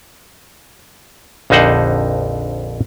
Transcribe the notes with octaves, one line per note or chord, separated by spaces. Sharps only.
A#1 F2 D3 D#4 C5 F#5